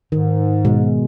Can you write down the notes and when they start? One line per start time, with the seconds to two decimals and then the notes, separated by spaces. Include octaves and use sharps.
0.12 G#2 D#3
0.65 B2 G#3